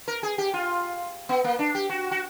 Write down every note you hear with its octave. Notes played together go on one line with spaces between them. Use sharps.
A#4
G#4
G4
F4
B3
A#3
D4
G4
F#4
F#4